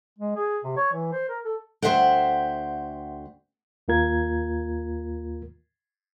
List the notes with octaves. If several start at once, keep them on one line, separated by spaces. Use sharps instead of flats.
G#3
G#4
C3
C#5
E3
C5
A#4
A4
D2 C3 C5 E5 F#5 G5
D#2 A#3 F4 A#4 G#6